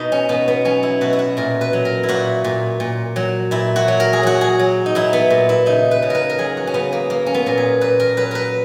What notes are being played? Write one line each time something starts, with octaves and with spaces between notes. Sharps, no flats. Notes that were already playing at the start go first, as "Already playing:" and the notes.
Already playing: B2 D#4
C#4
B2 B3
B3
F#3 C#4
E4
B2 F#4
E4
F#4
A#2 A#4
B4
F#3
A#4
E4
A#2 F#4
A#2
A#2
F#3
A#2 E4
F#4
F#3
A#4
G#4
F#3 F#4
G#4
F#3
D#4
F#3 E4
B3
A#2
E4
C#3 D#4
B4
C#3
A#4 B4
A#4
F#3 G#4
F#4
C#4
C#3 B3
A#3
F#3 A#3
C#4
B3
A#2 A#4
G#4
A#2 B4
A#4
F#3 B4
A#4 B4